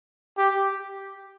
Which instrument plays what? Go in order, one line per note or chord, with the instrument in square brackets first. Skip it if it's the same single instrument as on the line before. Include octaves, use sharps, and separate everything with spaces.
[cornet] G4